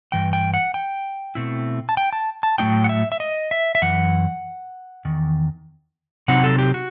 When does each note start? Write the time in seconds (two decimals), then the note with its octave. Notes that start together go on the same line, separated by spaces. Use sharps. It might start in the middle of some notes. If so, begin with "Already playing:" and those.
0.12 G2 E3 G5
0.33 G5
0.54 F#5
0.74 G5
1.35 B2 A3 C4 E4
1.89 A5
1.97 G5
2.13 A5
2.43 A5
2.58 A2 F#3 A3 D#4 G5
2.84 F#5
2.89 E5
3.12 E5
3.20 D#5
3.51 E5
3.75 E5
3.82 F#2 E3 F#5
5.05 E2 D#3
6.28 C3 F#3 C4 D#4 F#5
6.44 A4
6.59 G4
6.74 F#4